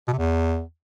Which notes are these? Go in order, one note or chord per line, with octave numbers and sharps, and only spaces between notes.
B2
C3
E2